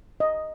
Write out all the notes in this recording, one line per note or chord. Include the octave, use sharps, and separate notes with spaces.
D#5